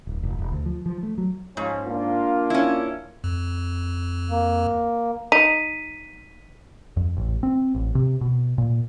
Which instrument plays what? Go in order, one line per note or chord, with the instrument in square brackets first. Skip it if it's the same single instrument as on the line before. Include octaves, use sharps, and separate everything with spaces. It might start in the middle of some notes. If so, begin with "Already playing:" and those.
[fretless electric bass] D1
F1
E1
D2
F3
F3
A3
F#3
[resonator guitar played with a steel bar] G#2 [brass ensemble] F3 C#4
[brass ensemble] A#3 D4 F4
[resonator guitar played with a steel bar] C#4 E4
[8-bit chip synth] F2
[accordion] A#3
[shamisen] D#4 [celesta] B6 D#7
[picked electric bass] F2
A1
C4
A1
C3
B2
A#2